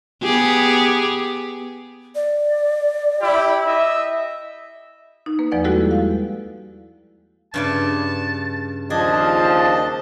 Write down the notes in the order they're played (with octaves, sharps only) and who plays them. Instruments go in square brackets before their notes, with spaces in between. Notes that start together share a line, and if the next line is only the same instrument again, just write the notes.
[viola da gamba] B3 G4 G#4
[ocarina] D5
[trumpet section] E4 G4
D#5 E5
[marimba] D#4
A#3 B4
E2 F3 B4 D5 F#5
G3 G#3 E4 F#4 G4 A4
F5
[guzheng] G2 C#3 D5 [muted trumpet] A5
[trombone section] D#2 F3 [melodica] D4 D#5 [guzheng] G#4 [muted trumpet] A5